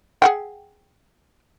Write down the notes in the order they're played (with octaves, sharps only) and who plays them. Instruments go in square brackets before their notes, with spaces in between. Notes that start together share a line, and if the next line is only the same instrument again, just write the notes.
[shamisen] G#4 F#5 G5